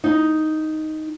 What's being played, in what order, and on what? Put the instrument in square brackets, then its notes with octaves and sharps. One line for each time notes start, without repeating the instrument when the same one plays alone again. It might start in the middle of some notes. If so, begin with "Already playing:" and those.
[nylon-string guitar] D#4